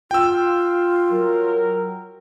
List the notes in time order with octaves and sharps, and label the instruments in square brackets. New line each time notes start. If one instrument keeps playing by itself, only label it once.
[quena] F4 [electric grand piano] G5 E6
[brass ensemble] F#3 A#4